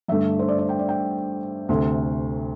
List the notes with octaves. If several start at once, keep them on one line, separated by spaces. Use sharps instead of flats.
G2 D3 A3 E5
C5
D5
D5
G5
D5
G5
D2 C3 A3 C6